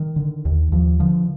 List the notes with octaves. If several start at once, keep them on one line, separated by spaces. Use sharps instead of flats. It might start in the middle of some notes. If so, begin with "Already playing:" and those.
Already playing: D#3
D3
D#2
D#2 F3
D3 F3